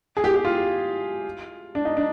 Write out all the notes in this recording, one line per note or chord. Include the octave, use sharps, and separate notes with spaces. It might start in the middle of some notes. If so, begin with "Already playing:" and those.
G#4
G4
G4
F4
D4
D#4
D4